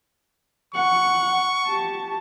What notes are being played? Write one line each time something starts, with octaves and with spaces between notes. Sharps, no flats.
F#5 C#6
G4 A5